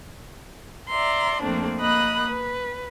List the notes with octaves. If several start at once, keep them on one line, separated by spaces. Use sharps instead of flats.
D5 E5 A#5 C6
F2 A3 A#3 C4 D4
A#3 D#5 B5 D#6 F#6
B4